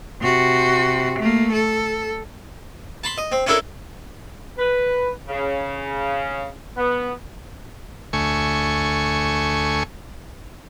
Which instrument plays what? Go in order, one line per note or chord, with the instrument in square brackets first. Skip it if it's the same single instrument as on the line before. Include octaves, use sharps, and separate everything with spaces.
[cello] C3 F#4
A3 A#3
A4
[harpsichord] A5 B5 C6
D#5
C4
C#4 D4 E4 A4 A#4
[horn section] B4
C#3
B3
[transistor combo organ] D2 A3 G#5 C#6